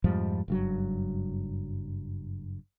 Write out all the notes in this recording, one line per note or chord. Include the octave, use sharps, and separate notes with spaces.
F2 G#2 F3 G3
F#1 G2 F#3